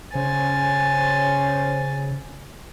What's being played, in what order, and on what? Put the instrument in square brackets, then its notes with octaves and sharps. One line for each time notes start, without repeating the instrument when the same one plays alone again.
[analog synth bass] C#3 [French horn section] C#4 C5 [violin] G#5 A6